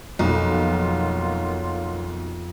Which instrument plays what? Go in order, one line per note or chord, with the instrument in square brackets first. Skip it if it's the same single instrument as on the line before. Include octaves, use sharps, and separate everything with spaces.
[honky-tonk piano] B1 [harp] F2 B3 [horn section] F#3 A#3 F4